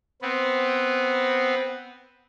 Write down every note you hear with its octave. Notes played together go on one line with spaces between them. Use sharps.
B3 C4